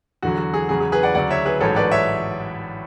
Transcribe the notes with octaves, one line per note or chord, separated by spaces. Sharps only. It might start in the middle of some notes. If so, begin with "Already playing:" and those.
E2 D3 F#3 F#4
F#4
G#4
E2 C#3 F#3 G#4
G#4
G#4 B4
D5 F#5
D2 C#3 F#3 D5 F#5
C#5 E5
G#4 B4
A1 G#2 F#3 A4 C#5
B4 D5
C#5 E5